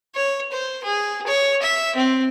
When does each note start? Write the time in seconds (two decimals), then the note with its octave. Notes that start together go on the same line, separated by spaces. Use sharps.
0.15 C#5
0.52 C5
0.84 G#4
1.27 C#5
1.62 E5
1.95 C4